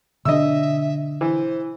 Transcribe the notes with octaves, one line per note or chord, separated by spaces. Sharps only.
B2 D3 D4 D#5 E5 E6
E3 C5